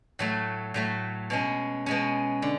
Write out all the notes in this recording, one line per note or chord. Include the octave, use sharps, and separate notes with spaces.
A2 F#3 A3
A2 F#3 A3
B2 G#3 C#4
B2 G#3 C#4
D3